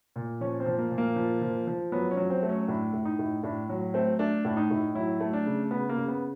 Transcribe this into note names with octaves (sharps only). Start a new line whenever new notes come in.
A#2
F3 C#4
C4
F3
A#3
A#2
A#3
F3
F3
F3
F#3 B3
C#4
F#3
C4
A3
C#4
A2 D4
A2
D#4
A2
A2 D4
F#3
A3 C4
A3 D4
A2 D4
D#4
A2
F#3 E4
A3
D4
C#3
C#3 B3
A#3
C#3
B3